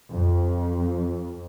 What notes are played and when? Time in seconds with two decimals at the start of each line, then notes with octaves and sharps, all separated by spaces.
0.16 F2